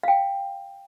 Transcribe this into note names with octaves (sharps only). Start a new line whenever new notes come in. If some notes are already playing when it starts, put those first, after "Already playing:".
F5 G5